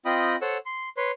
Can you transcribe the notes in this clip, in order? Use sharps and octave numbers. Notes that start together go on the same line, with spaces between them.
C4 F4 D#5 G5 B5 D#6
A4 C5 C#5 F#5 E6
C6
B4 C#5 C6